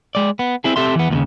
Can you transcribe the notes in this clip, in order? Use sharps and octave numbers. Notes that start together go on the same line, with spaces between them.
G#3 D5
B3
C4 E4 G#4
C4 G4 A4 E5 C6
E3 B3
D#2 A#2 C#3